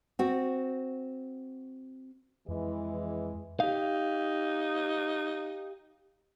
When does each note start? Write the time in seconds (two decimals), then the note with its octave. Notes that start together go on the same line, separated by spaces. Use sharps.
0.19 C4 F#4
2.48 F2 E3 G#3
3.60 D#4 G4 F5